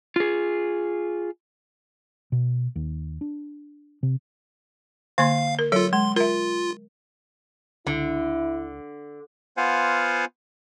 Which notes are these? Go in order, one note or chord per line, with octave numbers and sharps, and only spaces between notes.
F4 G#4
B2
D#2
D4
C3
D3 A#3 F5 C6
A#4
F#3 F4 A4 C#5
G#3 C6
F4 A#4 E5
C#2 D3 E4
B3 F4 C5 F5 F#5 G#5